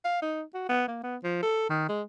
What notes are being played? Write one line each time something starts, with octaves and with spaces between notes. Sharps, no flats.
F5
D#4
F#4
B3
A#3
B3
F3
A4
D#3
G#3